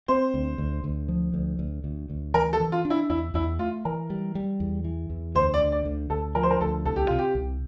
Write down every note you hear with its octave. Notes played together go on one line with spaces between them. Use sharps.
C4 C5
D2
D2
D2
F3
D2
D2
D2
D2
E3 A#4
A4
E3
F4
D4
E4
E2 E4
E2 E4
A3 F4
E3 A#4
G3
G3
E2
E3
E2
D2 C5
D5
D3
D5
D2
D2 A4
F3 A#4
C5
A#4
D2 A4
C2 A4
G4
C3 F4
G4
C2